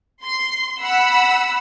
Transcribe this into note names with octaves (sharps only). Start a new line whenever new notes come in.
C6
F#5 B5 E6